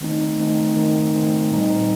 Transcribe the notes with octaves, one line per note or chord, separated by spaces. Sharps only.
D#3 A3 C4 D#4
D#3 A3 C4 D#4
D#3 A3 C4 D#4
D#3 A3 C4 D#4
A#2 G3 C4 D#4